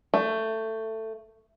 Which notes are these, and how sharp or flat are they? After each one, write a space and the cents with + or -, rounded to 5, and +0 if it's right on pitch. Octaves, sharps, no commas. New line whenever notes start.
A3 +15